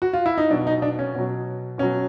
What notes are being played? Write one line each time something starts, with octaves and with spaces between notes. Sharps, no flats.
F#4
F4
E4
D#4
B2 F#3 D4
D#4
D4
C#4
B2 F#3
B2 F#3 C#4